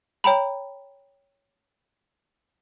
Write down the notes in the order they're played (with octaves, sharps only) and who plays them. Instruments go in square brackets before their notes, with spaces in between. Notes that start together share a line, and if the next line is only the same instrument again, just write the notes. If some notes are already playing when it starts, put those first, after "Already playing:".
[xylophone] C#5 G5 A#5 B5